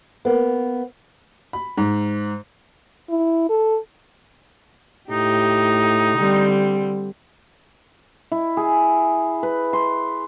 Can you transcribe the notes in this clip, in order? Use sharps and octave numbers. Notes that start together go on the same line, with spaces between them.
A#3 B3
B5
G#2
E4
A4
A2 D#4 G4
D3 G3 C4
E4
G#4
B4
C6